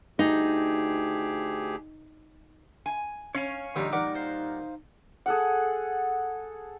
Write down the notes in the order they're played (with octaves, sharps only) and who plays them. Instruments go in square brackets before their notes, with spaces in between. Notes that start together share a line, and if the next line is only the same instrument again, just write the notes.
[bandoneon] D2 G4 G#4 [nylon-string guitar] D#4
[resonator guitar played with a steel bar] G#5
[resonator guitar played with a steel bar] C#4 [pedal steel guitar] C#5 F5 G#5
[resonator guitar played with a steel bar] A#2 G3 [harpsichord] D3 D#4 [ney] G4
[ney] D#4 [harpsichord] A#4 D5 F#5 [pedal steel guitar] D6
[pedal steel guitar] C5 F5
[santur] G#4 A4 F#5